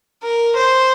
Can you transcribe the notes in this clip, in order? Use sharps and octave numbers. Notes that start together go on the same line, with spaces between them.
A#4
C5